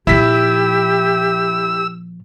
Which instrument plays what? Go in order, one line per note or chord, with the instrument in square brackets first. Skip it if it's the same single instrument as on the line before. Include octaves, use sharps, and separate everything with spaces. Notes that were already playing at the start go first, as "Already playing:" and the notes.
[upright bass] A#2 F3 [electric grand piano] E4 B6 [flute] G4 [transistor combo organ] E6